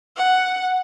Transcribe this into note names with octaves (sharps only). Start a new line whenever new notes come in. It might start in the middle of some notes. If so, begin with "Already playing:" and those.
F#5